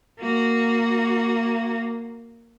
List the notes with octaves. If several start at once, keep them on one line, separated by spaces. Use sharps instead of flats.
A#3 F#4